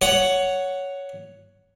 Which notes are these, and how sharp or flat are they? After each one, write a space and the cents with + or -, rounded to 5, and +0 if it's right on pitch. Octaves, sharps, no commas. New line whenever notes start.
C#5 +10 F#5 +0